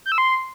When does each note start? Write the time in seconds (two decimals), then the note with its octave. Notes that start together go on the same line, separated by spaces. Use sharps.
0.06 G6
0.12 E6
0.18 C6